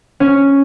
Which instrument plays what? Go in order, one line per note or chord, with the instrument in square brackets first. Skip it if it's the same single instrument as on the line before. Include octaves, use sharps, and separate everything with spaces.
[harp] C#4